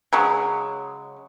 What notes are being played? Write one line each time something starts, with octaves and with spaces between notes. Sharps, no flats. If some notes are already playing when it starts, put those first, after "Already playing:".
C#3 F#3 G#3